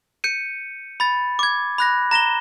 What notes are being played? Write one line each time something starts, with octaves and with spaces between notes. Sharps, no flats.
G6 C#7 D#7
B5 A6
D6 G#6
B5 F#6 A#6
A#5 A#6 E7 G7